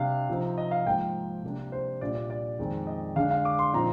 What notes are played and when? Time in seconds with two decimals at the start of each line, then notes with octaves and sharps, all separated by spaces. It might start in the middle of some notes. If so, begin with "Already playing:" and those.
Already playing: C3 G3 D4 F5
0.29 C3 F3 C4 D#4
0.58 D#5
0.71 F5
0.85 G#2 F3 A#3 G5
1.43 C3 G3 A#3 D4
1.72 C5
2.01 A#2 G3 D4 D5
2.15 D5
2.30 D5
2.58 F2 D#3 G#3 C4
2.87 D#5
3.16 D3 G#3 D4 F5
3.31 F5
3.45 D6
3.59 C6
3.73 A#2 F3 C4 D#4 A#5